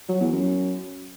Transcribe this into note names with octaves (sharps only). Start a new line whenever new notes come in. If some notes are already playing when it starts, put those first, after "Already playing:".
F#3
E2
F#2